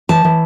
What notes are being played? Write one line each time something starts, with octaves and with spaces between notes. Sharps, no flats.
E3 A5
E3